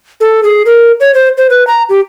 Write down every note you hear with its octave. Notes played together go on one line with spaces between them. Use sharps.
A4
G#4
A#4
C#5
C5
C5
B4
A#5
G4